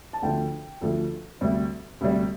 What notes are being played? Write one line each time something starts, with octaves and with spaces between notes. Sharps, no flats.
A5
D2 D3 F3 G5
D2 D3 F3 A4
D2 C3 G3
D2 C3 G3